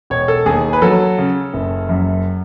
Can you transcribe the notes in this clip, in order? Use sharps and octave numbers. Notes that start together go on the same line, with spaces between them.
E1 C#5
A4
D#2 G#4
B4
F#3 A4
C#3
F#1
F#2